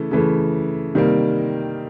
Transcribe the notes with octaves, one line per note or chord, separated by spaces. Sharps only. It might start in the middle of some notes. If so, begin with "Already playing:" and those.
Already playing: C#3 E3 A3
C#3 E3 A3
C3 D#3 G3 A#3